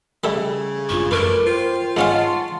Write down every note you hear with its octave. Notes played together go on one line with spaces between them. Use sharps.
C#3 G3 A3 E5
G#1 G2 F4 C#6
F#2 A3 A#4 B4 D6
F4 C5 G5
G#2 C#4 F5 F#5 A5 C6 C#6